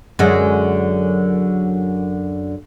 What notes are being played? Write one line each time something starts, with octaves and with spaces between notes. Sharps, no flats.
F#2 D3 G#3